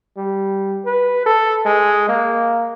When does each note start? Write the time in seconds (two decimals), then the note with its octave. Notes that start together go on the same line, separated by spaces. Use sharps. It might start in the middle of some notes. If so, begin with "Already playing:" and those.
0.17 G3
0.86 B4
1.26 A4
1.65 G#3
2.09 A#3